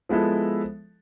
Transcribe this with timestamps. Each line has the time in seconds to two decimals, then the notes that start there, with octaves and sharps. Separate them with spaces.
0.09 F3 G#3 B3 E4 A4